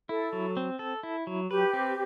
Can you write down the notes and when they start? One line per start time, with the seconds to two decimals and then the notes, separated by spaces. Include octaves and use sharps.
0.09 E4 A4
0.33 F#3
0.57 C4
0.79 A4
1.03 E4
1.27 F#3
1.50 G4 B4
1.73 C4